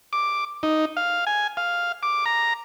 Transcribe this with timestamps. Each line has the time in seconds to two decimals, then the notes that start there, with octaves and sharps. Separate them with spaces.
0.13 D6
0.63 D#4
0.97 F5
1.27 G#5
1.57 F5
2.03 D6
2.26 A#5